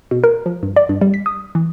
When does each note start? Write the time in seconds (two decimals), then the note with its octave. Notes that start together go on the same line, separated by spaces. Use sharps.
0.11 B2
0.24 A#4
0.46 F3
0.63 G2
0.76 D5
0.89 G2
1.01 G3
1.14 B6
1.26 D#6
1.55 E3